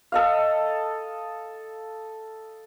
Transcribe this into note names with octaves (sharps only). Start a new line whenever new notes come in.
A4 D#5 F5